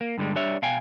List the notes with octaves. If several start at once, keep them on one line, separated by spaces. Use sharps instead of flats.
A#3
G2 D3 F3 G3 G#3
G3 D4 C#5 E5
B2 F5 G5 G#5